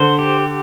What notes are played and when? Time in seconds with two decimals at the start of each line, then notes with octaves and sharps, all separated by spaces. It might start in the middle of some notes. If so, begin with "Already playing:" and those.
Already playing: D3 C5
0.19 G4